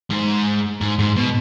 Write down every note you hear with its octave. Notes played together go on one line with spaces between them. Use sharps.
G#2
G#2
G#2
B2